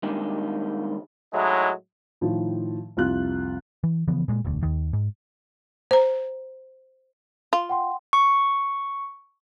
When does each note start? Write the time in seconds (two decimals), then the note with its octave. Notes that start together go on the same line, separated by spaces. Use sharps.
0.03 D#3 G3 G#3 A#3 D4 D#4
1.33 A2 F#3 G#3 D#4 E4
2.21 A2 D#3 F3
2.97 C2 F2 F4 F5 F#6
3.84 E3
4.08 C#3 E3 F3 B3
4.28 A#2 G#3
4.45 E1 D2
4.63 D#2 D#3
4.93 G#2
5.91 C5 A#5
7.53 F4
7.69 F#5 G5 C6
8.13 C#6